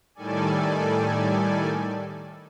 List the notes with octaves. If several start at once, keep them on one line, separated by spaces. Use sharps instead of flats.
A2 D#3 G3 A4 D5 G#5